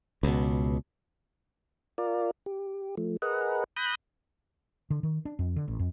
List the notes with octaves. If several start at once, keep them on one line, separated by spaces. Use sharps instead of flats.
C#2 B2
F4 A#4 D5
G4
F3 A3
G#4 A#4 B4 D#5 F#5
B5 D#6 F#6 G6 A#6
D3
D#3
D4
F2
D3
A1
F2